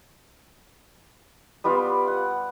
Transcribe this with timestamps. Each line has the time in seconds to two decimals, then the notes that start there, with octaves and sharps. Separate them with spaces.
1.64 G3 B3 F4 D5
2.08 F#5